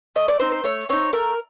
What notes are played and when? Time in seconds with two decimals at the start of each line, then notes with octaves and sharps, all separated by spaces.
0.16 A3 D#5
0.28 D5
0.40 C4 D#4 C5
0.52 C5
0.64 A3 C#5
0.89 C4 D#4 C#5
1.13 A3 A#4